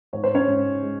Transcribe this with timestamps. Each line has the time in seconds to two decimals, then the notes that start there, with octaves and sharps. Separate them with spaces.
0.13 G#2 C#5
0.23 C5
0.34 C#4 C#5
0.47 G#2
0.83 G#3